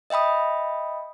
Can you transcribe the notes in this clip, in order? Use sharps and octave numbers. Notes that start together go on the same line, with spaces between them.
D#5 E5 G5 B5 D#6